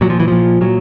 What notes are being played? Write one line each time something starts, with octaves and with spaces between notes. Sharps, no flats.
A#2 F#3
F3
E3
A#2 F3
A#2 F#3